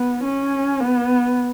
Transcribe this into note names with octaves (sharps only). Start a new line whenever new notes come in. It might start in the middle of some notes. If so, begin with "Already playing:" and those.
Already playing: B3
C#4
B3